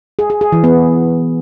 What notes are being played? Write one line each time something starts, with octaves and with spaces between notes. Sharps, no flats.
G#4
G#4
G#4
E3
B3